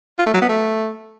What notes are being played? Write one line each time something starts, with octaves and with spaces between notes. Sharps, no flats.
F4
A3
F#3
B3
A3